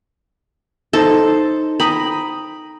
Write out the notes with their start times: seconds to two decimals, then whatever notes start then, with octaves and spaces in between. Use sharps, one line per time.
0.93 D#4 A4 C5
1.80 G5 A#5 B5 D#6